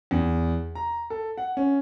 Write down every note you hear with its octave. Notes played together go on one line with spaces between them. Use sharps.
E2
A#5
A4
F#5
C#4